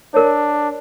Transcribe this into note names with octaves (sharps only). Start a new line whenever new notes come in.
D4 A#4 C#5